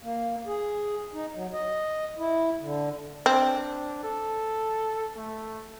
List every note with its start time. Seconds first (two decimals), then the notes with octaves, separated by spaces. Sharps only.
0.03 A#3
0.46 G#4
1.14 D#4
1.34 F#3
1.53 D#5
2.18 E4
2.61 D3
3.26 C4 D4
4.03 A4
5.16 A3